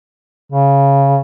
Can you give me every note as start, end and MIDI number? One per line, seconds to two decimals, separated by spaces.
0.52 1.19 49